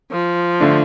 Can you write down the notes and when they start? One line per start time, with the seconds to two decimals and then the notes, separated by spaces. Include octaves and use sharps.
0.11 F3
0.60 D3 A3 D4